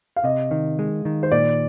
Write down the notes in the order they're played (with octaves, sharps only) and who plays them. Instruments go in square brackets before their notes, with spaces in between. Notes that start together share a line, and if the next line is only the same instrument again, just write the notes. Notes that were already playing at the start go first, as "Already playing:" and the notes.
[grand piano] F5
[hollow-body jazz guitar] C3 [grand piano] D#5
[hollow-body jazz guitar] D#3
G#3
D#3
[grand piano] C5
[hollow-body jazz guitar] A#2 [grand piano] D5